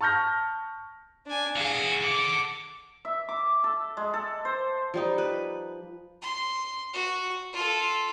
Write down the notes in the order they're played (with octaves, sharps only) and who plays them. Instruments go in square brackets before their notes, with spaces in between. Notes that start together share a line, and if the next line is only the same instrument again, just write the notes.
[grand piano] A5 C#6 F6 G6 A#6
[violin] D4 G#5
[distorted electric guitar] E3 F#4 [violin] G#4 F5
[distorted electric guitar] A4 F#5 [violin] D6
[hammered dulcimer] E5
D6
A4
G#3
A4
C5
[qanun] F3 G3 D#4
B4
[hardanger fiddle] C6
F#4
F4 A4